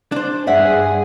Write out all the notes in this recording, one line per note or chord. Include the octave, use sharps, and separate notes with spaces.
D4 C5
G2 G#4 D5 E5 F#5